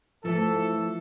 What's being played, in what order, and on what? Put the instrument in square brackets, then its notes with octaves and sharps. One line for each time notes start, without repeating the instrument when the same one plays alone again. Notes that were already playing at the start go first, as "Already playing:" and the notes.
[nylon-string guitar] E3 A3 [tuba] F3 [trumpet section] A4